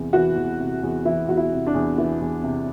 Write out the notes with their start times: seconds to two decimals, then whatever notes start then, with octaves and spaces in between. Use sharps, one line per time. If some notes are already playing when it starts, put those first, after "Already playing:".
Already playing: E2 C3
0.13 E3 F#4
0.37 E2
0.60 C3
0.83 E2
1.05 E3 E4
1.28 E2 F#4
1.37 E4
1.52 C3
1.67 D4
1.74 E2
1.98 E3
2.20 E2
2.43 C3